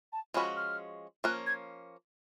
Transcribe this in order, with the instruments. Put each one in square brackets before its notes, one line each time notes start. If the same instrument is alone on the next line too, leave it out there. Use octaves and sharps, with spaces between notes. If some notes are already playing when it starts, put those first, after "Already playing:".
[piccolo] A5
[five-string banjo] F3 G#3 C#4 F#4 [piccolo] B5
[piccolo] F6
[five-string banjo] F3 A#3 C#4 [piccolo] F#6
[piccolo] G#6